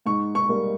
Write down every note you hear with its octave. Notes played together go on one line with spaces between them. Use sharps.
G#2 C#6
C#6
G3 A#3